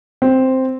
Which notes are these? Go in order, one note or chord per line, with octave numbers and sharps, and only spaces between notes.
C4